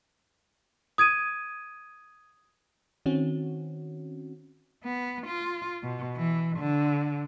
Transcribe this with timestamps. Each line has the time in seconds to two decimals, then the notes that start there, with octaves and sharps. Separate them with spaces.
0.98 D#6 G#6 D7 D#7
3.06 D#3 C4 C#4 F#4
4.84 B3
5.27 F4
5.83 B2
6.16 E3
6.58 D3